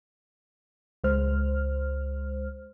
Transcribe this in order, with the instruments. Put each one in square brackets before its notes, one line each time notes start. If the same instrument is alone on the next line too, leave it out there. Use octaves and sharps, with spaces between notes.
[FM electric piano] C#2 G#3 C5 F6